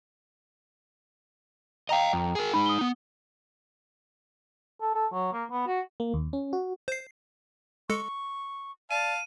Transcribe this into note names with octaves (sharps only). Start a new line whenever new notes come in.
D#5 F5 G5 A#5 F7
F2
G#4 A#4
G#3 D#4 B5
D#6 G7
B3
A4
A4
F#3
A#3
B3
F#4
A#3
D#2
C#4
F#4
C5 C7
G#3 A4 C#6 C#7
D5 F5 A5 D#7